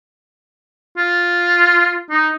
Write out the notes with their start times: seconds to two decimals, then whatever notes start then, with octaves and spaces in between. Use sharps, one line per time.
0.98 F4
2.11 D#4